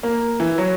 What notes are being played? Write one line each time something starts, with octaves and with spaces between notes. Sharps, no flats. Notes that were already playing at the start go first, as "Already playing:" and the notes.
A#3
E3
F#3